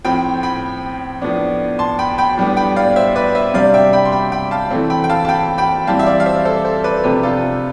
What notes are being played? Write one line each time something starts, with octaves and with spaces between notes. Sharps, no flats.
A2 F3 C4 G5 B5
G5 B5
A2 F3 B3 D4
A5 C6
G5 B5
G5 B5
A2 G3 B3 D4
G5 B5
D5 F5
C5 E5
B4 D5
C5 E5
C3 G3 D4 D5 F5
E5 G5
G5 B5
C6
G5 B5
G5 B5
F5 A5
E3 A3 C4
G5 B5
G5
F5 A5
A5
G5 B5
G5 B5
E3 G3 C4 F5 A5
E5
D5 F5
F5
C5 E5
A4 C5
A4 C5
B4 D5
C3 F3 A3 D4 G4 B4
F4 A4